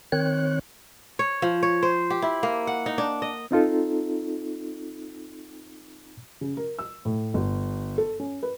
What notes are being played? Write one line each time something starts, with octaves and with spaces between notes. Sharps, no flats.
D#3 C4 C#5 F#6
C#5
F3
C#5
C5
G4
E4
A#3
F#5
D#4
D4
D#5
C4 D#4 F4 A4
C#3
A#4
E6
A2
G1
A4
C#4
B4